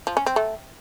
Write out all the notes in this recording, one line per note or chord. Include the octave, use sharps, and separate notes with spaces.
F3
C#4
C4
A3